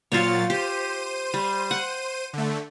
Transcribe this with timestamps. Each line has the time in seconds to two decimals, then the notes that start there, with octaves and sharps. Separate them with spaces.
0.12 A#2 F#3 F4 C5 C#5 A6
0.50 G4 C5 D#7
1.34 G3
1.71 F#5
2.33 D3 A3